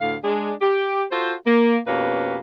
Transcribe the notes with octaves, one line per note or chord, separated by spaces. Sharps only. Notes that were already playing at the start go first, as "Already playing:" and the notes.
D2 A2 D3 F5
G#3 D4 G#4
G4
F4 F#4 A4 C5
A#3
F2 B2 A#3 C#4 G4 B4